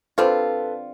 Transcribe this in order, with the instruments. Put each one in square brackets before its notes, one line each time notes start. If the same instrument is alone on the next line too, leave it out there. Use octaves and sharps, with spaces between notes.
[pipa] D3 G3 C4 F4 [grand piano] A4 B4